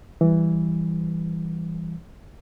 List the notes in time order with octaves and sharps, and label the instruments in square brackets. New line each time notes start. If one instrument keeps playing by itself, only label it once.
[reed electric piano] E3 G3